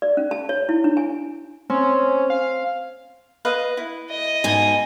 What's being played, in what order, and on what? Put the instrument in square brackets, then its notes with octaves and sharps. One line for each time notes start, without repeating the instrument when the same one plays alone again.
[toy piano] D5
C#4
A5
C#5
E4
D4
G#5
[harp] C4 [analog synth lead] C#4
[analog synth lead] F5
[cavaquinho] B4 D#5 F5
E4
[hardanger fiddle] D#5
[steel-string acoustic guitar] G#2 B2 G#5